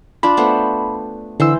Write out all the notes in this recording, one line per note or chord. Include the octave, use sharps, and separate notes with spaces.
D4 F4 D5 B5
A3 B3 C5
D3 E3 C5 E6